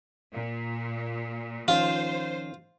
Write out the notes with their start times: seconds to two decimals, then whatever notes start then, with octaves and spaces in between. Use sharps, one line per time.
0.32 A#2
1.68 D#3 F3 C#4 F4 C5